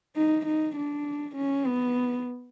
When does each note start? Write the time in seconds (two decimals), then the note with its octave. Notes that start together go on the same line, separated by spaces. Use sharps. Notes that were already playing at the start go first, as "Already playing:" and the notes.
0.16 D#4
0.46 D#4
0.76 D4
1.36 C#4
1.66 B3